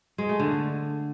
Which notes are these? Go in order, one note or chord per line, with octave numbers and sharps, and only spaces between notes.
G#3
A3
D3